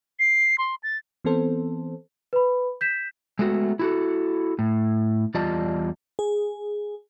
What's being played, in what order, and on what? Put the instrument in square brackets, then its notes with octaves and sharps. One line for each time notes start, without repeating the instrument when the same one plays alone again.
[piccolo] C7
C6
A6
[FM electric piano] E3 B3 C4 A4 C5
[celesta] B4 B5
G6 B6 E7
[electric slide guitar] G#3 A3 B3 F#4
E4 F#4 A4
A2
E2 G3 F4 D5 D#5 A5
[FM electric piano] G#4